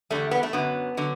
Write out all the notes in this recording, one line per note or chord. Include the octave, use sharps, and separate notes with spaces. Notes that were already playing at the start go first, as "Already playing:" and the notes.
E2 D3 G3 A3
B3
A3
F#2 D3 F#3 B3
D3 F#3